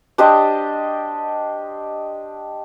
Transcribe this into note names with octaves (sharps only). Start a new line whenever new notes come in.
D4 G4 C5 D#5